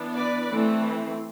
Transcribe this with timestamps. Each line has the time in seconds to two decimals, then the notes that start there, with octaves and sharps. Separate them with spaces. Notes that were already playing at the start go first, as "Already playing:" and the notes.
Already playing: E3 B3 D4
0.15 B4 D5
0.51 E3 A3 C4